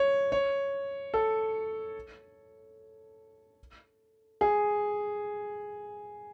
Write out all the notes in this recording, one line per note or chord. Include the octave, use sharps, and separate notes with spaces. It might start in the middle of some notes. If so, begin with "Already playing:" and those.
Already playing: C#5
C#5
A4
G#4